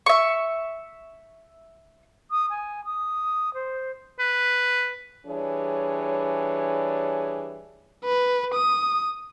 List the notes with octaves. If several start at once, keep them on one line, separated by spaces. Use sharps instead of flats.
E5 C#6
D#6
G#5
D#6
C5
B4
E3 G3 D4 G#4 C#5
B4
D#6